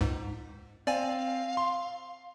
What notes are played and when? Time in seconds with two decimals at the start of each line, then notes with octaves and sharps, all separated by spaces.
0.01 C#2 G#2
0.87 C4 D5 F5 G#5
1.57 C6